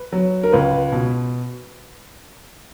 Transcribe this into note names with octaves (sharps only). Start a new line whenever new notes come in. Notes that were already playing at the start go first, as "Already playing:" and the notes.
Already playing: B4
F#3
A#4
C#2 B4
B2